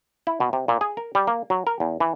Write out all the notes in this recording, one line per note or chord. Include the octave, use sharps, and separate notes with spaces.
E4
B2
C3
A#2
G#4
A#4
G3
A#3
F#3
A#4
E2
E3